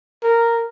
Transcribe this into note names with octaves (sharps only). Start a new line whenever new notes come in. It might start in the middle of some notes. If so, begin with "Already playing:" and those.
A#4